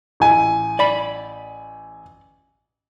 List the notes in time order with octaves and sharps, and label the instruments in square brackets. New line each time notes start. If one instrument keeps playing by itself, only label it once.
[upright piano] A1 E4 G#5
[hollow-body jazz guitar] D5 B5